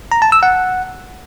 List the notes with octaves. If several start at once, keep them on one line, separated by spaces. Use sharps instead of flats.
A#5
A5
E6
F#5